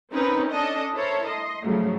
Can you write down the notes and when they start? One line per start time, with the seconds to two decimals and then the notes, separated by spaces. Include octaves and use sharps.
0.12 C4 C#4 D#4 A#4 B4
0.51 C#4 D4 A4 D#5
0.94 E4 A4 A#4 C5 C#5
1.28 D#5 C6
1.64 G#2 C#3 F3 F#3 A3